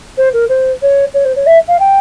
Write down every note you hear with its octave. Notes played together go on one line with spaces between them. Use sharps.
C5
A#4
C5
C#5
C#5
C5
C#5
E5
F5
G5